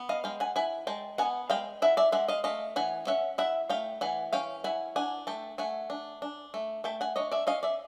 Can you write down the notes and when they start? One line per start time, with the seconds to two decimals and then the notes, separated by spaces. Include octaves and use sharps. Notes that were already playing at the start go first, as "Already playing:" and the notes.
Already playing: B3
0.09 D#5 F5
0.24 G#3 F5 G5
0.40 F#5 G#5
0.56 E4 F#5 G#5
0.87 G#3 G5 A5
1.18 B3 F#5 G#5
1.50 G#3 F5 G5
1.82 E4 E5 F#5
1.97 D5 E5
2.12 G#3 E5 F#5
2.28 D#5 F5
2.44 A3 D#5 F5
2.76 E3 F#5 G#5
3.07 C#4 E5 F#5
3.38 E4 E5 F#5
3.69 A3 F5 G5
4.01 E3 F#5 G#5
4.33 C#4 F5 G5
4.64 E4 F#5 G#5
4.96 D4 F#5 G#5
5.27 A3 G5 A5
5.58 A3 F#5 G#5
5.90 D4
6.22 D4
6.54 A3
6.84 A3 G5 A5
7.01 F#5 G#5
7.16 D4 C#5 D#5
7.32 D5 E5
7.47 C#4 D#5 F5
7.63 D5 E5